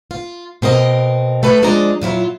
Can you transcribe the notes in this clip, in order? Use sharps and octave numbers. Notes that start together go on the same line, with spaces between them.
F4
B2 C4 A#4 D#5
A3 A4 B4
F3 G#3 D4 D5 D#5 A#5
A#2 F#3 E4 F4